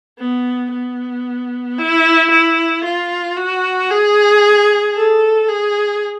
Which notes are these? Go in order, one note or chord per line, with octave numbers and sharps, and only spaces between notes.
B3
B3
E4
E4
F4
F#4
G#4
A4
G#4